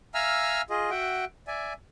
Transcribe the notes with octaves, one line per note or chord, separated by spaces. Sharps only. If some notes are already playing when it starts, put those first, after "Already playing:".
E5 F5 G#5 A#5 E6 F6
F4 G#4 D#5
F#4 E5 F#5 G5
D5 E5 G#5